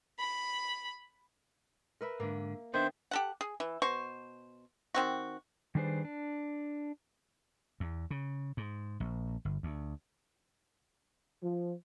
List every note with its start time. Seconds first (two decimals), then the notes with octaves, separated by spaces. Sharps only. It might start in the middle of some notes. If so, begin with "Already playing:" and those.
0.19 B5
2.01 A#4 B4 E5
2.20 G#2 D3 A#3
2.74 D#3 B3 D4 C5 E5
3.11 G4 A4 F#5
3.41 G#4
3.60 E3
3.82 B2 C5 C#6
4.94 D#3 C4 F#4
5.75 D#3 G3 D4 G#4 B4 C5
6.05 D4
7.80 E2
8.11 C#3
8.57 G#2
9.00 A#1
9.45 G1
9.63 D2
11.42 F3